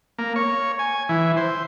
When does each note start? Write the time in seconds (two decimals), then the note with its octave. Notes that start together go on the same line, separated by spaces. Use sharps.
0.18 A#3
0.36 C#5
0.79 G#5
1.09 E3
1.37 C5